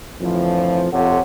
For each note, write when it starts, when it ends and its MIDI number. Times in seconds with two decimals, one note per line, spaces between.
0.21 0.87 41
0.21 0.87 45
0.21 0.87 50
0.21 0.87 52
0.21 0.87 53
0.92 1.19 41
0.92 1.19 48
0.92 1.19 65
0.92 1.19 69
0.92 1.19 73
0.92 1.19 78